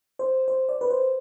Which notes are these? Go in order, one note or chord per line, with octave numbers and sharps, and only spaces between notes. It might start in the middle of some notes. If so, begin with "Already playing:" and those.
C5
C5
D5
B4
C5